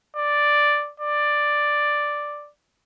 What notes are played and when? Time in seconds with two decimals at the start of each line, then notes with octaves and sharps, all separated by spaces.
0.17 D5
1.00 D5